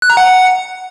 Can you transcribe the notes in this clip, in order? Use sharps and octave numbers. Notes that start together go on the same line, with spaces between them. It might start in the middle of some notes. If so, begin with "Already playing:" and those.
F#6
A#5
F#5